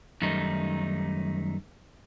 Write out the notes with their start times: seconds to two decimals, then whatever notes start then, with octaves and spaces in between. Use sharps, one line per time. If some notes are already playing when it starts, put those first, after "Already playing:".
0.22 F#2 D#3 G3 A3 D#4